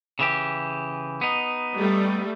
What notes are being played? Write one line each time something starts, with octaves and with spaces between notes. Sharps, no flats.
C#3 E3 G4
B3 D#4
G3 A3